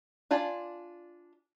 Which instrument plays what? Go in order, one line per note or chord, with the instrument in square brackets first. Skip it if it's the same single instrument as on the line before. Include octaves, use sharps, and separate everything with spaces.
[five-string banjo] D4 F4 D5 G#5 A5